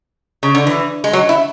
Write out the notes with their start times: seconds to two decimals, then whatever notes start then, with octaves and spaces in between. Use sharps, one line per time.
0.43 C#3
0.55 D3
0.67 E3
1.04 G#3
1.13 F#3
1.29 E4